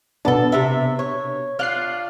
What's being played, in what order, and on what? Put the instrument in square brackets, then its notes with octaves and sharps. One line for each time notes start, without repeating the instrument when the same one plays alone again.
[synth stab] B2 B3 D4 [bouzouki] A4 A5
[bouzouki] C3 E5
C#5
[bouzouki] D4 F4 [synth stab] F6 F#6 C7